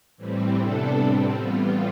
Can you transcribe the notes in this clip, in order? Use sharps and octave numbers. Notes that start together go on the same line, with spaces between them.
A2 E3 G3 C4
C3 G3 B3 D4 A4
A2 G3 C4
A2 E3 G3 B3 F4